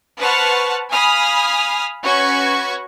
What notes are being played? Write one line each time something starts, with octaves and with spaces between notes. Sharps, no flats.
B4 C5 F#5 A5 C#6 F6
F5 G#5 B5 D#6 F6
C#4 F#4 B4 C#6 G#6